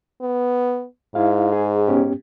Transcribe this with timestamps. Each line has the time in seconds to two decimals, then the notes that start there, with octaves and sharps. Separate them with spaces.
0.22 B3
1.15 G#2 E4 F5
1.52 G#4
1.88 B3 C#4 G4